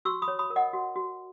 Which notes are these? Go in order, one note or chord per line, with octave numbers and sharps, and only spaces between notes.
F#4 C#6 E6
B5 D#6
C#5
B5 D#6
A#4
D#5 F#5
F#4
F#4